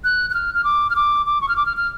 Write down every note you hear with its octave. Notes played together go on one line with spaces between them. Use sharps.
F#6
F#6
F6
F6
D6
F6
D6
D6
C#6
F6
D6
F6
F6